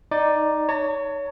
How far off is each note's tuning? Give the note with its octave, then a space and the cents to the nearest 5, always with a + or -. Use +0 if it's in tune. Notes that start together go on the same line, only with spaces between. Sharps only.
D#4 +0 D5 +10
C#5 +20 A#5 -45